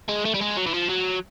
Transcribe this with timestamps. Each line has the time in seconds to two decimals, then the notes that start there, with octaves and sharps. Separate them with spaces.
0.09 G#3
0.25 A3
0.34 G3
0.41 G#3
0.56 F#3
0.66 E3
0.74 F3
0.89 F#3